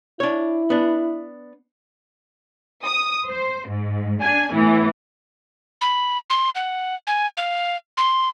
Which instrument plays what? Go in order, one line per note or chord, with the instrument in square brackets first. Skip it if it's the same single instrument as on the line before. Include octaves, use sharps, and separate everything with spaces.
[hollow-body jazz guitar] D4 C#5 [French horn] E4
[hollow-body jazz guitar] B3 D4
[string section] D#6
C5
G#2
D4 G#5
A2 E3 B3
[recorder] B5
C6
F#5
G#5
F5
C6